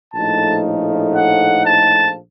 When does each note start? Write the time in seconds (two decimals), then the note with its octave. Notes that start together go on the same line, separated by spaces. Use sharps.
0.13 A#1 A2 F3 A3 D#4 A5
1.15 F#5
1.66 A5